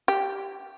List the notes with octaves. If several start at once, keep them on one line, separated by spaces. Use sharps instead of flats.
G4